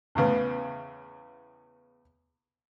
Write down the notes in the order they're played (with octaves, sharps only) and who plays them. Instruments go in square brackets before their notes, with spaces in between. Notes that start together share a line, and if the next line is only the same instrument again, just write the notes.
[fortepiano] E2 A2 C#3 B3